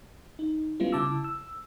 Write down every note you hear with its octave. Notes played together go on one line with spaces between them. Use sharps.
D#4
G3 B3 C#4 E4 F4
C#3 E4 A5 D6 E6
E6